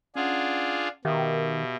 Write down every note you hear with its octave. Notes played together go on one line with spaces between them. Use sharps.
C#4 D4 F4 G#4 F#5
B2 D#3 G4 E5 F5